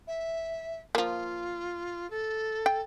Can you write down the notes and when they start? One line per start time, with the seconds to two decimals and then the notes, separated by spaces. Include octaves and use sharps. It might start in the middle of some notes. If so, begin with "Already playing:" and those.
0.07 E5
0.95 F3 A#3 F4
2.10 A4
2.66 G5